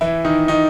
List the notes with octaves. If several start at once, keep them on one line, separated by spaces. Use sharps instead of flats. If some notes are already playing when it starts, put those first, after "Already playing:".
E3 E4
D#3 D#4
D#3 D#4